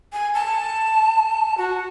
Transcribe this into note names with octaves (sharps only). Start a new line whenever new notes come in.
G#5
A5
F#4